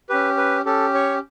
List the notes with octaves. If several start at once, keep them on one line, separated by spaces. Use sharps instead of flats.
C#4 G4 B4
B4
C#4 G4 A4
C#5